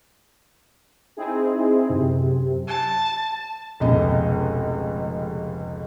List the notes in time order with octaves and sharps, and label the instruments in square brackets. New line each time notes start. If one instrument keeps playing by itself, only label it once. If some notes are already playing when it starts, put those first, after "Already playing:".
[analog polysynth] C4 D#4 E4 G#4
F#2 C3
[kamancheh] A5
[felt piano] F1 C#2 B2 D#5